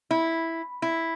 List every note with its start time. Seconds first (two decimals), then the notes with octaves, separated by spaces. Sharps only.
0.11 E4
0.82 E4